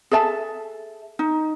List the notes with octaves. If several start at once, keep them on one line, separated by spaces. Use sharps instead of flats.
G#4 A4 E5 A5
D#4